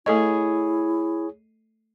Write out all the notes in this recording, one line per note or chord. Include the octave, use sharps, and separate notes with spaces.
A3 E4 G#4 A4 C#5 D#5